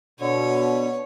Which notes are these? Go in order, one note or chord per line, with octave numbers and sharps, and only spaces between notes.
B2 D3 C#5